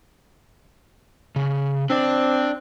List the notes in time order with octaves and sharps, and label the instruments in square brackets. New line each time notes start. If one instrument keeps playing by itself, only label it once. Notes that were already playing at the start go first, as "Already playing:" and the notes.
[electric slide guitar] C#3
[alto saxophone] C4 [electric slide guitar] D4 D5